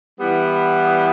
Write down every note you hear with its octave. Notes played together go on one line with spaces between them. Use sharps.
E3 G3 B3